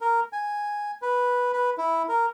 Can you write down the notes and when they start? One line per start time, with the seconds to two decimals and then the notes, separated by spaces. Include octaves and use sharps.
0.01 A#4
0.33 G#5
1.02 B4
1.53 B4
1.78 E4
2.09 A#4